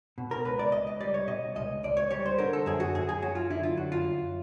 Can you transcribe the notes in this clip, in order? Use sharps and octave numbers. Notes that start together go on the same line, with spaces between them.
B2
A#4
C#2 B4
D5
C#2 D#5
D#5
G3 D5
C#5
B2 D#5
C#2 D#5
C#2 D5
C#5
G3 C#5
C5
D3 A#4
A4
F#2 G#4
F#4
F#2 G#4
G#4
F#3 F#4
F4
D3 E4
F4
F#2 F#4
F4
F#2